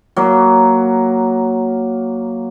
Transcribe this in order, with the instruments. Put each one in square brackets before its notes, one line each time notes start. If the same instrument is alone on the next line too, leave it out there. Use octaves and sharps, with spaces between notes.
[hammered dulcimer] F#3 A#3